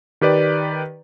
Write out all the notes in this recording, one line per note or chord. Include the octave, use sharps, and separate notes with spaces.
D#3 G4 B4 D5